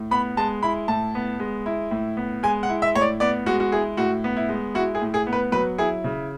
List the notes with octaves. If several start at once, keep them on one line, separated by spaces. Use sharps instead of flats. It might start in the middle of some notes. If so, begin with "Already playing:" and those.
Already playing: A2
B3 B5
G#3 A5
E4 B5
A2 A5
B3
G#3
E4
A2
B3
G#3 G#5
F#5
E4
E5
A2 C#5
D5
B3 D5
G#3 F#4
F#4
E4 G#4
A2 F#4
B3
E4
G#3
E4 F#4
G#4
A2
G#4
B3
B4
F#3 B4
E4 G#4
C#3